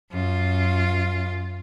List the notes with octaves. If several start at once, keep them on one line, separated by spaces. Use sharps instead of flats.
F#2 F4